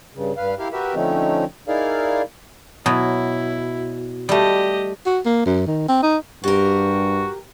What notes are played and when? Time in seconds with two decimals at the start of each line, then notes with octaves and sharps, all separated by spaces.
0.14 G2 C#3
0.37 G2 B4 F5
0.59 E4 G4 A#4 F5
0.73 F#4 G4 A#4 B4 E5
0.95 D3 F3 A3 C4 C#4 D#4
1.68 D#4 E4 G#4 A#4 D5 F5
2.86 B2 F#3 E4
4.29 G3 A3 G4 D#5
5.06 F#4
5.25 A#3
5.46 F#2
5.67 D#3
5.88 C4
6.03 D#4
6.44 G2 F#4 G4 A#4